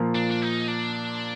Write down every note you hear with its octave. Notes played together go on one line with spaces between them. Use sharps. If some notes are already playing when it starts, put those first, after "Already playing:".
Already playing: A#2 F3 A#3
D4
D4
D#4
D4